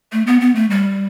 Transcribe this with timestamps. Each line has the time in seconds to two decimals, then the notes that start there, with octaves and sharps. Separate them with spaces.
0.12 A3
0.27 B3
0.41 B3
0.55 A3
0.70 G3